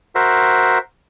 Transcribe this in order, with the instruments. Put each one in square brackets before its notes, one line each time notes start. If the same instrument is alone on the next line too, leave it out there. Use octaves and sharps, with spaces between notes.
[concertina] F#4 A#4 C5 E5